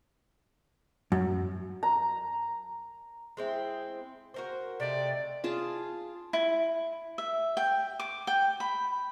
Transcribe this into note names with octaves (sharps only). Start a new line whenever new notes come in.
F#2
A#5
G#3 C4 E4
F#4 A#4 C5
C3 A3 D5 D#5
F4 G#4 A5
E4
E5
G5
D6
G5
B5